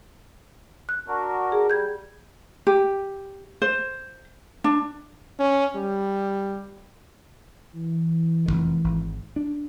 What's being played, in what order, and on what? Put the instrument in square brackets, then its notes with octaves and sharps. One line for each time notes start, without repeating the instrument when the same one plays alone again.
[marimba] F#6
[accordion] D4 F#4 A#4
[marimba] G#4
[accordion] G3 [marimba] G6 G#6
[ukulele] G4
C5
D4
[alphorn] C#4
G3
[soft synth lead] E3
[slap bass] F1 C2 D#3
G#1
D4